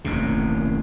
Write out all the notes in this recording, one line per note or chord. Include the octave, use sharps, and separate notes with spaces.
D#1 A1 F#2 C3